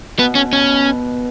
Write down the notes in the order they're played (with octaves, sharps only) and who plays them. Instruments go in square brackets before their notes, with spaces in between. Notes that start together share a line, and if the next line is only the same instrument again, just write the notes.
[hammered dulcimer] B2 [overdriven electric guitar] B3
[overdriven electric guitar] C#4
C#4